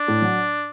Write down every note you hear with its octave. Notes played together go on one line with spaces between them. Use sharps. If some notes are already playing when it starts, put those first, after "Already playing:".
Already playing: D4
A2
F#3